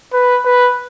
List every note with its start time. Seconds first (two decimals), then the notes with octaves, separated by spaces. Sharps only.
0.13 B4
0.45 B4